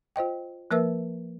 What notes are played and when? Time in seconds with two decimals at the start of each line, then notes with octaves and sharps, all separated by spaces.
0.16 F4 C5 D#5 G5
0.71 F3 A#3 A#4 B4 E5 E6